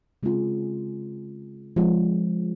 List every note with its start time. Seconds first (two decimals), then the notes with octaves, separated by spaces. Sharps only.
0.23 C#3 G#3 C4 F4 G#4
1.76 F3 G#3 C4